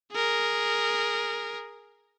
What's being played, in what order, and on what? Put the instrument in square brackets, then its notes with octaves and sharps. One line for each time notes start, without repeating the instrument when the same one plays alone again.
[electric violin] G#4 A#4